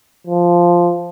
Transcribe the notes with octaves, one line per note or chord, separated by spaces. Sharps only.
F3